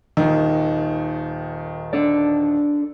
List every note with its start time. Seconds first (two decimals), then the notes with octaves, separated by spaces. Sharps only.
0.17 D#1 D#3
1.93 D4 A4 D5